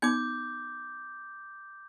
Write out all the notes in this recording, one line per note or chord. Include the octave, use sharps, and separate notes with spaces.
B3 D#4 D6 G6